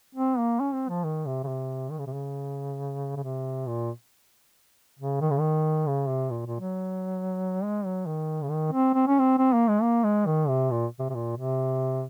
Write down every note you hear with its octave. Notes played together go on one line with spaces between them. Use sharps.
C4
A#3
C#4
C4
F3
D#3
C3
C#3
C3
D#3
C#3
C3
C#3
C#3
C3
A#2
C#3
D#3
C#3
D#3
C#3
C3
A#2
A#2
F#3
G#3
F#3
D#3
C#3
D#3
C4
C4
C#4
C4
C4
A#3
G#3
A#3
G#3
D#3
C3
A#2
C3
C3
A#2
C3